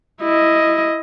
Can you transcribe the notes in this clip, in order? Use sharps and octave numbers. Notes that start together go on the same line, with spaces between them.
E4 D#5